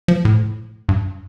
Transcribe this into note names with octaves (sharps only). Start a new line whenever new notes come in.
F3
A2
G2